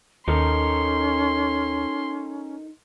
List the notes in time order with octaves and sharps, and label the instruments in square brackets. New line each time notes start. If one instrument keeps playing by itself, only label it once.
[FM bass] D#2 [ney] C#4 [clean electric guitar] D#4 A4 A#4 [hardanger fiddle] C6